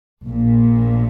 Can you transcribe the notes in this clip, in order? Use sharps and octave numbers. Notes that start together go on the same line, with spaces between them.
A#1 A#2